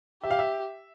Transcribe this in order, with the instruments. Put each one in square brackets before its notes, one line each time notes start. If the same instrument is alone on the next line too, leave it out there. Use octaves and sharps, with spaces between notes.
[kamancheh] G4 [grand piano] E5
[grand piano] F5
E5